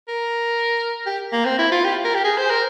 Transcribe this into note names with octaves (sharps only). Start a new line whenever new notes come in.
A#4
G4
A#3
C4
E4
F4
G4
A#4
G4
G#4
C5
A#4